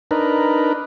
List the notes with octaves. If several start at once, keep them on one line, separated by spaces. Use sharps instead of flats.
D4 D#4 A#4 B4